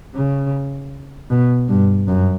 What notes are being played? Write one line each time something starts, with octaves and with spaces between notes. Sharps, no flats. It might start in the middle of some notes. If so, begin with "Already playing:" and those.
C#3
B2
G2
F#2